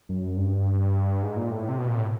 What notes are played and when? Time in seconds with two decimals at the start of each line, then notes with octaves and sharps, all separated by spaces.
0.09 F#2
0.37 G2
1.23 G#2
1.36 A#2
1.51 A2
1.69 C3
1.78 B2
1.88 A#2
1.97 A2